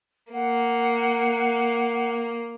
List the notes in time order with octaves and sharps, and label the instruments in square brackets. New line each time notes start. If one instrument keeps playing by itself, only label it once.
[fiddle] A#3 [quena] F#5